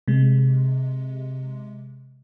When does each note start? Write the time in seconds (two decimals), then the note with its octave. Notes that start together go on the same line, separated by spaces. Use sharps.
0.08 C3 G#3